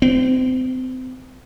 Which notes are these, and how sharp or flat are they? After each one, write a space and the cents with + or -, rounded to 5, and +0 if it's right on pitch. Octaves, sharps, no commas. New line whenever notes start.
C4 -30